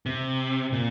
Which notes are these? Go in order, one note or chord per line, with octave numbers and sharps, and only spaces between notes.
C3
A#2